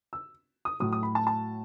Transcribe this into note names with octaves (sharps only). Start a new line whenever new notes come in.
E6
D#6
A2 F#3 D#6
D#6
B5
A5
A5